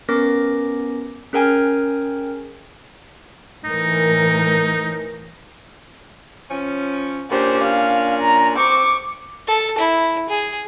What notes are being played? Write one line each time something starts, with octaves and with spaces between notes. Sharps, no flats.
B3 C#4 A#4 D6 A#6
C#4 G#4 A#4 G5 G#5 F6
A2 E3 D#4 A#4
F3 C#4
A#2 C#4 D4 G4 C5
F5
A#5
C4 C#6 D6
A4
E4
G#4